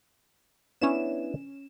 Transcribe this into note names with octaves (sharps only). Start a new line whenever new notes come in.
B3 C#4 D4 E4 E7